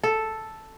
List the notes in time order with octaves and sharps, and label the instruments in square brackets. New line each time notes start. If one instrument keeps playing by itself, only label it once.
[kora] A4